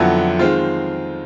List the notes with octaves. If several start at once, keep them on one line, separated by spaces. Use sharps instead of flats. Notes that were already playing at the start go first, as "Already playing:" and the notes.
Already playing: F2 D3 F#3 B3 E4
D#3 G#3 C4 F4